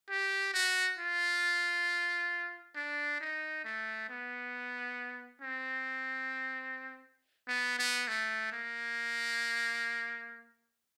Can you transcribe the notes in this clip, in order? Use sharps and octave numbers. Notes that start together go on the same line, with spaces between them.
G4
F#4
F4
D4
D#4
A3
B3
C4
B3
B3
A3
A#3